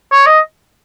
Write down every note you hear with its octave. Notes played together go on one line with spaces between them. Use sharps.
C#5
D#5